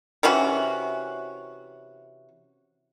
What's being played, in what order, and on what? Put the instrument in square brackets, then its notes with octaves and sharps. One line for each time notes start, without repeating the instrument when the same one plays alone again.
[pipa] C3 E3 C#4 F#4